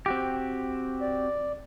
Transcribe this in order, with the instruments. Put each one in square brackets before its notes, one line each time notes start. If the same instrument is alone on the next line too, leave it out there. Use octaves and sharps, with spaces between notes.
[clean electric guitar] C4 F#4 G4
[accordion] D5